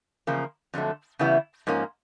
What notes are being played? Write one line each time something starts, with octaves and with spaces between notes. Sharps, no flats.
E2 C#3 F3 A#3
F2 D3 F#3 A3
C#3 E3 G3 B3 E4
G#2 F3 A#3 C#4